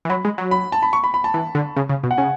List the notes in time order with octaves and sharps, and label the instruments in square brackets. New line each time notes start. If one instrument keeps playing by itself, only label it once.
[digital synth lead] E3
[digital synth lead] F#3 [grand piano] B5
[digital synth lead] G#3
F#3
[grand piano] B5
A5
B5
C#6
B5
B5
A5
[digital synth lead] E3
D3
C#3
C#3
B2
[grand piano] F#5
[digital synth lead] C#3 [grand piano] G#5